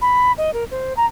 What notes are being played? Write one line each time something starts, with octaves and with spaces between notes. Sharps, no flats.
B5
D#5
A#4
C5
A#5